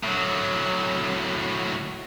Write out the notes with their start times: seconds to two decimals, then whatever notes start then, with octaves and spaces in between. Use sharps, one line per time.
0.03 A2 F#3